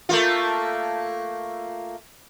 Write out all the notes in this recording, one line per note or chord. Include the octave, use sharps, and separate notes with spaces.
A3 A#3 F4